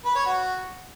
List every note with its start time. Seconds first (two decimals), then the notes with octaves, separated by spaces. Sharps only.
0.05 B4
0.15 C#5
0.26 F#4